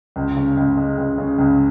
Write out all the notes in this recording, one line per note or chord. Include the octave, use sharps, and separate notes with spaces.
C#2
C#3
C#2
G#3
C#2
C#3
C#2